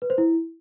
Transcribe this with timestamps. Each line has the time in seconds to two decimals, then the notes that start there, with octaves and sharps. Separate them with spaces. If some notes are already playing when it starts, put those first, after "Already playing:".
0.02 B4
0.10 C5
0.18 E4